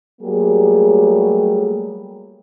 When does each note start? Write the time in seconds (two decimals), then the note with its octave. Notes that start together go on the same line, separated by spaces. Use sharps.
0.22 F#3 G3 A3 A#3 G4 G#4